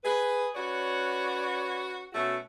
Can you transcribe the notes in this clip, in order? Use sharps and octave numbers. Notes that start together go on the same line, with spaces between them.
G#4 B4
C#4 F#4 B4 C#5 D5
B2 A3 C#4 F#4